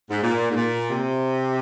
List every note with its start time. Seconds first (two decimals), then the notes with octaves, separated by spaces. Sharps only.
0.11 G#2
0.22 A#2
0.51 G#2
0.56 A#2
0.90 C3